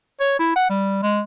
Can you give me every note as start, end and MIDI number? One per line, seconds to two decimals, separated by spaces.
0.20 0.36 73
0.39 0.55 64
0.56 0.68 78
0.70 1.01 55
1.03 1.21 56